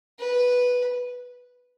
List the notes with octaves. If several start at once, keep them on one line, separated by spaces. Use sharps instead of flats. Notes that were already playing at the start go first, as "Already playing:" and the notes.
B4